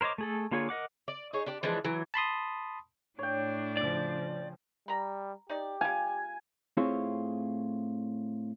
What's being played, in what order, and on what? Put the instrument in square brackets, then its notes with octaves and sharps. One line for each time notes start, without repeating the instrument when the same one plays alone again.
[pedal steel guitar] A#4 C5 C#5 D#5 D6
A3 G#4 A4
D3 A#3 F4 G#4 C#5
A#4 D#5 F#5 D6
[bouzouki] D5
D#4 G#4 C#5
D4 G4 D5
E3 F3 G#3 D4
E3 F#3
[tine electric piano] A5 B5 C6 D#6
[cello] A2 D4 [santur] C#5 G5
[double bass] C#3 F3 [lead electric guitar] D5
[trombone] G3 [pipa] A#5 B5
[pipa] D#4 D5 [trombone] G4
[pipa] G3 F5 [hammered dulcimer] G#5
[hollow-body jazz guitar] A2 C4 E4 F4 G#4 C#5